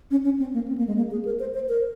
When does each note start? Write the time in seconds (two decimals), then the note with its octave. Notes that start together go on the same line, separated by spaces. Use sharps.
0.11 C#4
0.25 C#4
0.40 C4
0.54 A#3
0.68 C4
0.78 A#3
0.87 G#3
0.97 A#3
1.11 G#4
1.25 A#4
1.40 C5
1.54 C5
1.69 A#4